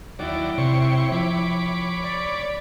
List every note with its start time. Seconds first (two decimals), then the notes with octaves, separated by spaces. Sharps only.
0.19 D#2 F#3 E4 D5 G5
0.58 C3 C5 C#5 C#6
1.12 F3 C#5 B5 D6
2.04 D5